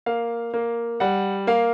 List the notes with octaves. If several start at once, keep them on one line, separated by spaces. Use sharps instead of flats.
A#3 F5
A#3
G3 F#5
A#3 F5